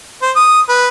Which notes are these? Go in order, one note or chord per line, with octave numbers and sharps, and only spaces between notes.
C5
D#6
B4